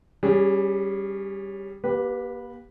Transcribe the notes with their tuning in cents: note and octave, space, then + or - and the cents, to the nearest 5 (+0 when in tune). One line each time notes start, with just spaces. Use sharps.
G3 +0 C#4 +0 G#4 -25
A#3 +35 G4 +0 B4 -10